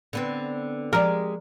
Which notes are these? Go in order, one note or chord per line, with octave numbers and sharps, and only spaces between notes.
D3 B3 C4
F3 G#3 G4 A#4 D5